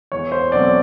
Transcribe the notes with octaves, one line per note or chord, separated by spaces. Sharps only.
E2 C#5
C5
B2 F#3 A3 C4 D5